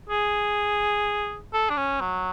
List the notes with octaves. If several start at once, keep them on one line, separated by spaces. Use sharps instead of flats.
G#4
A4
D4
C#4
F#3